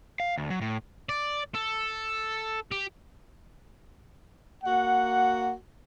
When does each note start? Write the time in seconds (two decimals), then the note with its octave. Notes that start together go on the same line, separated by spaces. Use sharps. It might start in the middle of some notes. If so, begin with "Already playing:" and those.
0.20 F5
0.37 D2
0.50 F#3
0.61 A2
1.09 D5
1.55 A4
2.71 G4
4.64 A#3 F#4 F#5